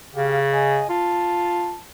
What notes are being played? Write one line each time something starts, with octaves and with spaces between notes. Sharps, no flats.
C#3 G4 F5
D#5 G#5
F4 A5